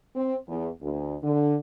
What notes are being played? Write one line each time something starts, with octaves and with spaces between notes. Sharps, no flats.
C4
E2
D2
D3